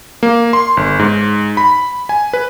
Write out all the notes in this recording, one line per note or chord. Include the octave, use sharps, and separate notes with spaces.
A#3
C6
G1
G#2
B5
G#5
B4